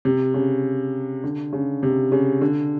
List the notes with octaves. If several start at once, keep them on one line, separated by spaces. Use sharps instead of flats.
C3
C#3
D3
C#3
C3
C#3
D3